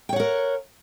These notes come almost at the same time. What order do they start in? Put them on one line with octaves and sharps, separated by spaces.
G5 C#5 F#5 A#4